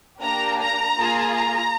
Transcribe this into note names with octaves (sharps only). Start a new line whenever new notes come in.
A#3 D4 G4 A#5
A#5
A#3 F4 G#4
A#5